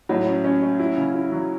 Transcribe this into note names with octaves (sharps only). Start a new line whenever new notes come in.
A2 F#3
C#4
C#4
C#4
E4
C#3
E4
F#3